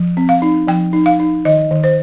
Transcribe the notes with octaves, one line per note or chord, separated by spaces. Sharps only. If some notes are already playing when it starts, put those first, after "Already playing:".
Already playing: F3
C4
F5
D#4
F3 G5
D#4
F5
D#4
D#3 D#5
D#3
C5